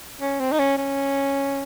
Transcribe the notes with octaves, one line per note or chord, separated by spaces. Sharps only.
C#4
C4
D#4
C#4
C#4